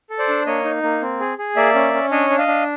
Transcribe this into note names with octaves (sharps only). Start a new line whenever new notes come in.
A4
C5 D5
D4
A#3 C#5 D#5
D#4
A#3
C4
G#4
G#4
A#3 D5 E5
C#4
C#4
D4 C#5 D#5
D4
D#5 F5
D4